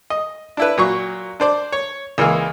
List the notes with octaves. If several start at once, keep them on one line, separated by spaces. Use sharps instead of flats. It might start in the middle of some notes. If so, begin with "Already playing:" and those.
D#5
D4 E4 B4
A#2 F#3 C#6
D4 C5 D5
C#5
C#2 E3 G#3 A#3 F5